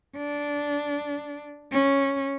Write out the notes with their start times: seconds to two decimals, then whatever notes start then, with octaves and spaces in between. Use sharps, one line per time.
0.17 D4
1.71 C#4